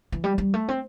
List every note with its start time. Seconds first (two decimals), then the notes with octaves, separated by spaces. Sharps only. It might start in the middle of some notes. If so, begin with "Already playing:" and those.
0.12 E3
0.24 G3
0.38 G3
0.54 A3
0.68 C4